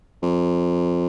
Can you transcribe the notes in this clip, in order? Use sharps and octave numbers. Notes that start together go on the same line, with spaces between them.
F2